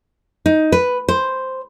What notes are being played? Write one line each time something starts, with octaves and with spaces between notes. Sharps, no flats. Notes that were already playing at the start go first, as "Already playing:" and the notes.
D#4
B4
C5